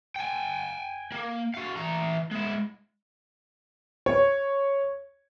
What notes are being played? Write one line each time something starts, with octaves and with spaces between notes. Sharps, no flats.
G5 G#5
A#3
F#4 F5
E3 A#5
G#3 E4
C#5